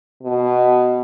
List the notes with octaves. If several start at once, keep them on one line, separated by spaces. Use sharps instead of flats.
B2